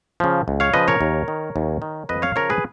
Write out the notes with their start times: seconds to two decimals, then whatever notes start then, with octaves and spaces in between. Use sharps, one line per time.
0.20 C#3 F3
0.48 C#2
0.60 C#5 F5
0.74 C#3 F3 B4 D#5
0.88 A#4 C#5
1.01 D#2
1.28 D#3
1.56 D#2
1.82 D#3
2.09 F2 B4 D#5
2.22 C#5 F5
2.36 C#3 F3 A#4 C#5
2.50 G#4 B4